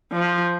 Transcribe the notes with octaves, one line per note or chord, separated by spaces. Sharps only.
F3